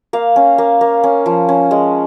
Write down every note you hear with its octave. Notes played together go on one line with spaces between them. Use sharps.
A#3 F5
C#4
A#3
A#3
C#4
F3
C#4
G#3